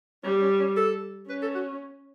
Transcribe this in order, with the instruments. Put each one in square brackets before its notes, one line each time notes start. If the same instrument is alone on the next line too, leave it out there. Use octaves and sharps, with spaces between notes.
[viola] G3 [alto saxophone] C#4
[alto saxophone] C#4
C#4
A4
[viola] C#4 [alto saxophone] B4
[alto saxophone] A4
F#4